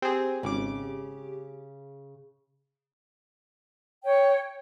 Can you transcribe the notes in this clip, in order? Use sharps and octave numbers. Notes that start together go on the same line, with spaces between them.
C4 G4 G#4
G#1 C#3 D6
C#5 G5